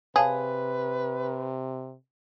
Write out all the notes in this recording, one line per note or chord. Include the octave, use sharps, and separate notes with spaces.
C3 G#4 B4 C#5 F5 A5